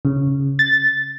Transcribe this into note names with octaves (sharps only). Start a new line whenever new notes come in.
C#3
A6